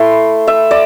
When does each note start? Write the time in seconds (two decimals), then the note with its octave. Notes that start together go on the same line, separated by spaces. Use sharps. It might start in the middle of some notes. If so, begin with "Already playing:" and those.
Already playing: A3 E4 C6
0.47 E5
0.71 D5